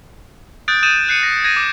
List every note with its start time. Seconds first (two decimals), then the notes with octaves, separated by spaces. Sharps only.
0.68 D#6 F#6 G6 A6 D7
0.83 D#6 G6 A6 D#7 E7
1.09 F#6 C7 C#7 D#7
1.23 A#6
1.44 G#6 A#6 D#7
1.56 D6